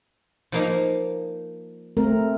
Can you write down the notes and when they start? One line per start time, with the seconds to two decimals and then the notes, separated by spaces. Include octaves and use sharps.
0.52 F3 A#3 D#4
1.97 A3 C4 A#4